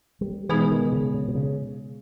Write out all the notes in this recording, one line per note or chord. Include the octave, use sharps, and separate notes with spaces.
G3
B2 E3 G#3 B3 D#4 G#4
D#3
C#3
C#3
B2
C#3